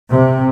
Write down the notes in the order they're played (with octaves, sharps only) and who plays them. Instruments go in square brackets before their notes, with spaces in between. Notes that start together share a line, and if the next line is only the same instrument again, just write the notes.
[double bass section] C3